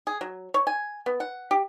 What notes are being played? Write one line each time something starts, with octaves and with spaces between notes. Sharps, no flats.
G#4
F#3
C#5
G#5
B3
F#5
G4